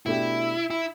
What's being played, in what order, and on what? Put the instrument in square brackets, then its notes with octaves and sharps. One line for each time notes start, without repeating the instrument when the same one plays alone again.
[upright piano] B2 A3 D4 G4 [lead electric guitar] E4
[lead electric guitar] E4